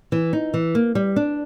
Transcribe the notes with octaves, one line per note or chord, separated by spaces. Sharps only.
E3
D#4
E3
A#3
G3
D4